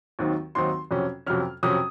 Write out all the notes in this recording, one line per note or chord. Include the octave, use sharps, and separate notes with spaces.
D#2 D#3 F#3 C4 D#4
D#2 D#3 F#3 C4 D#4 C6
F2 C3 F#3 C#4
F2 C3 F#3 C#4 F6
F2 C3 F#3 C#4 D#6